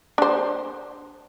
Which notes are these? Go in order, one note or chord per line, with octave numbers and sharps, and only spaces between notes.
D4 C5